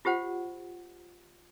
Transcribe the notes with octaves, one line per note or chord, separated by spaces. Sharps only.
F4 G4 C5 F#5